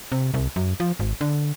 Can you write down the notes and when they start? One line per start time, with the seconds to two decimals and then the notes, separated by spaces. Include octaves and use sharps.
0.12 C3
0.34 C2
0.56 F#2
0.80 F3
1.00 G#1
1.21 D3